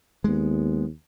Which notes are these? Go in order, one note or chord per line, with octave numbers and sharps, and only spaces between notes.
D#2 G#3 B3